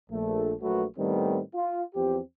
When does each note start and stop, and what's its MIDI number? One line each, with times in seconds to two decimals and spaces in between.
0.10 0.53 34
0.10 0.53 57
0.61 0.84 34
0.61 0.84 54
0.61 0.84 57
0.61 0.84 66
0.61 0.84 71
0.97 1.40 45
0.97 1.40 51
0.97 1.40 55
0.97 1.40 57
0.97 1.40 59
0.97 1.40 60
1.54 1.83 65
1.94 2.19 40
1.94 2.19 53
1.94 2.19 60
1.94 2.19 67